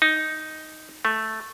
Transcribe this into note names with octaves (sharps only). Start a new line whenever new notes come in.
D#4
A3